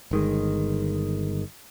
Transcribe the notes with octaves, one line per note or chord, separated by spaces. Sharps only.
G1 D#3 G#3